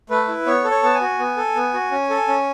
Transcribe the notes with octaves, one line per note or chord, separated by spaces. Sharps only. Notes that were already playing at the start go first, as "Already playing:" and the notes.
A3 B4
E4
B3 C#5
A4
C#5
B3 A5
G#5
F#4
B3
A4
B3
F#4
C#4
A4
C#4